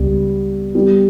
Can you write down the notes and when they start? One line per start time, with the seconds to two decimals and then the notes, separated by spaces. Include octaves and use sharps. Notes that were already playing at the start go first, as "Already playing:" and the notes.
Already playing: C#2 C#3 G3 B3
0.75 G3 B3